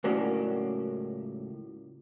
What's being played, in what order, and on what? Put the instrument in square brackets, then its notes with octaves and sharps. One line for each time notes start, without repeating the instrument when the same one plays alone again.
[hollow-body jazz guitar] C#2 A2 F#3 A#3 C#4 D4